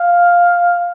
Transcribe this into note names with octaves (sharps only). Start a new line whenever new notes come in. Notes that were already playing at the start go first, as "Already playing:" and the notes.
Already playing: F5